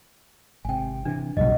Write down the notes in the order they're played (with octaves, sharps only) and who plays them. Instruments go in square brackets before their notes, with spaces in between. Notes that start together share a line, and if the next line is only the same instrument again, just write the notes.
[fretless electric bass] G#1 C3 [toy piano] G5 G#5
[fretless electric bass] C3 E3 [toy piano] D4
[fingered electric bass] F1 B1 G3 [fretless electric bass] F#3 [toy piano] D#5 F#5